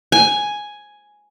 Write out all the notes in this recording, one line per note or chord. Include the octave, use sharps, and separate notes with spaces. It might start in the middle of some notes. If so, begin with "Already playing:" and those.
G#5